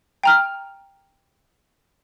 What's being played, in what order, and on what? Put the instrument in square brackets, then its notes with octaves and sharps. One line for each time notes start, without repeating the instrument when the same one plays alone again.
[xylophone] G5 A#5 F6